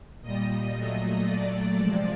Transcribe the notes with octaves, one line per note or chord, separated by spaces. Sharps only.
A#2 G3 D#5
A#2 F#3 A3
A#2 F#3 A3 D5
C3 F3 G#3